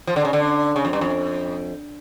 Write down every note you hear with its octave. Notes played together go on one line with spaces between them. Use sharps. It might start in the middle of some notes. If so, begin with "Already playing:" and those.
F3
D3
C#3
D3
C#3
F2
G2
F2